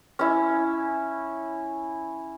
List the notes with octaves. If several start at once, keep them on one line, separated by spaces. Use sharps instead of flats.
C#4 E4